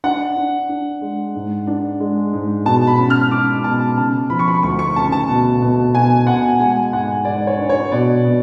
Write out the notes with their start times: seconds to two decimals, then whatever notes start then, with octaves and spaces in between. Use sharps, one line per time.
0.04 D4 F#5
0.36 D4
0.69 D4
1.01 G#3
1.35 G#2
1.67 D4
2.00 G#3
2.33 G#2
2.65 B2 A5
2.87 B5
2.98 C#4
3.10 F6
3.31 C#4 D6
3.64 B2 A5
3.97 C#3 A5
4.30 F3 B5
4.39 C#6
4.48 B5
4.63 D2 C#6
4.79 C#6
4.96 C#3 A5
5.12 A5
5.28 B2
5.62 B2
5.94 B2 G#5
6.27 B2 F#5
6.59 G#3 G#5
6.92 G#2 F#5
7.25 G#2 D5
7.47 C#5
7.58 D4
7.69 C#5
7.92 B2 D5
8.24 B2